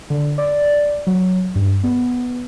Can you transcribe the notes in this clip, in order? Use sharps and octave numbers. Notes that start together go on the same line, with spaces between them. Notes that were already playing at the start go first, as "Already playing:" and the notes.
D3
D5
F#3
G2
B3